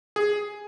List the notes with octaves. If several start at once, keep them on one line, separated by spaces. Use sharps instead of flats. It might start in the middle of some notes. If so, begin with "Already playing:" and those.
G#4